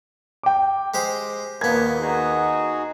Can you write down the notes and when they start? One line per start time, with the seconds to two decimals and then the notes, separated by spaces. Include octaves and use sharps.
0.43 G5 D6
0.94 G#3 G4 C5
1.61 D#2 A#2 A#3 B3 G#6
2.00 D#4 F#4 G#4